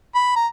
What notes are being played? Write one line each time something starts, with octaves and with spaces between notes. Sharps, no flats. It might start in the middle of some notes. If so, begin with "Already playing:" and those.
B5
A#5